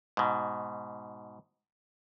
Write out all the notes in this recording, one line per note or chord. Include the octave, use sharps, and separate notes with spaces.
G#2 B2